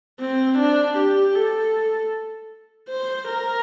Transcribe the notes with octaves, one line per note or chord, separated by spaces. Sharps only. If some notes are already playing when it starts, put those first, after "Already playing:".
C4
D4
G4
A4
C5
A#4